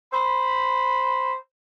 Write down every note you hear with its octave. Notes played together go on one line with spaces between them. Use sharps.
C5 B5